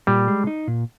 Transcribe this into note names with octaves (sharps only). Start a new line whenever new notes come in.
A#2 G3
G#3
D#4
A#2